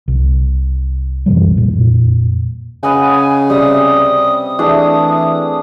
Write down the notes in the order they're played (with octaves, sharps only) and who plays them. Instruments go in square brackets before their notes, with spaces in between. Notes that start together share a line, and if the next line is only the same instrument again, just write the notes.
[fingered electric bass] C2
F#2 C3 E3 G3
F2 A#2
[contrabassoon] C#3 [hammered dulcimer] B4 D#5 F#5 [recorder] G#5
[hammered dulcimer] C3 [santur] G3 E6 [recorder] D#6
[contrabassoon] E3 [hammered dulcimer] A3 [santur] D4 G#4